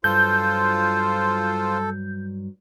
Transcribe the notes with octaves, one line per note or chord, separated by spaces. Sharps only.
G2 F#3 F4 A4 C5 G6